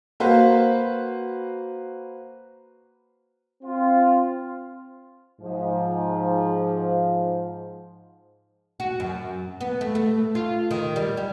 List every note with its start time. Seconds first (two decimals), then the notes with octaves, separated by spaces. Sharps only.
0.20 A#3 F#4 B4 C5 F5
3.63 C4 F4
5.41 G#2 F3
8.80 F#4
9.00 F#2
9.61 B3
9.81 A3
9.95 A3
10.35 F4
10.71 D#3
10.96 G3
11.17 G3